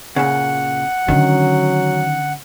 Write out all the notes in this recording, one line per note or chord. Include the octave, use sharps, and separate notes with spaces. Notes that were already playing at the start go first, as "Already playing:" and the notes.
A#2 C#3 F#5
D3 D#3 F#3 C#4